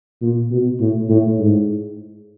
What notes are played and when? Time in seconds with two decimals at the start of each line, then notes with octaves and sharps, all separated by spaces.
0.21 A#2
0.50 B2
0.80 A2
1.09 A2
1.39 G#2